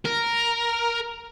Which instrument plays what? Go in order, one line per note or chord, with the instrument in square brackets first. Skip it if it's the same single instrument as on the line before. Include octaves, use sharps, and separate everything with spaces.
[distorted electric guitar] A#4